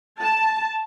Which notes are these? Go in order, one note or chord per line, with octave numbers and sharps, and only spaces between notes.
A5